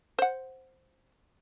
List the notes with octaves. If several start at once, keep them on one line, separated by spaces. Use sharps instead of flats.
C5 F#5